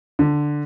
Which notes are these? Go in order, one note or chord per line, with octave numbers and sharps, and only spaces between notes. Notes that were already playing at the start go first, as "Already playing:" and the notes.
D3